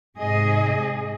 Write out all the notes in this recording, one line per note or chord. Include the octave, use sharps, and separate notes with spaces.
G#2 C3 G#4 D#5